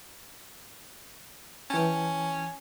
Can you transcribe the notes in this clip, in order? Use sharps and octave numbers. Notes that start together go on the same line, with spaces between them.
E3 C#4 G5 A5